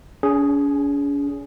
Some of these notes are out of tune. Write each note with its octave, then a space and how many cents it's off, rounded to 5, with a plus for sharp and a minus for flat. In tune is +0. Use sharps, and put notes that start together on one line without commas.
C#4 +45 G#4 +0